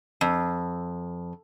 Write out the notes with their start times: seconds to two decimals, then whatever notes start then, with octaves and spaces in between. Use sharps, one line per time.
0.21 F2